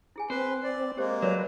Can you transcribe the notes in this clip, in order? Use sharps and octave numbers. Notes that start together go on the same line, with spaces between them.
E4 G#4 G#5
C4 B4 C5
D5
G#3 A#3 G4 C5
F#3 B4 C#5 D5